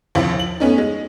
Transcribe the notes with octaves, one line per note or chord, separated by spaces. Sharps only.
A#1 D#2 C3 E4 F5
F#7
A3 B3 C#4 D#4
G#3